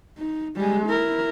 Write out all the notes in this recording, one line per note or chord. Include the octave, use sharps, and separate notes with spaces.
D#4
G3 G#3
E4 A#4